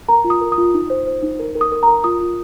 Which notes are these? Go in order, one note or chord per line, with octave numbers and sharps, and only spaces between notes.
A#4 A#5
F4
D#6
A#4
D#6
F4
D#4
C5
C5
D#4
A#4
A#4
D#6
A#4
A#4 A#5
F4 D#6
F4